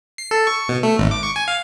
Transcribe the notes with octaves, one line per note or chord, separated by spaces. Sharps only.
C7
A4
C#6
B2
A3
G#1
D6
C#6
G#5
F5